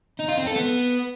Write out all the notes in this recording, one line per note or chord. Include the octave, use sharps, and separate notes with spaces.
D#4
F4
C4
A4
B3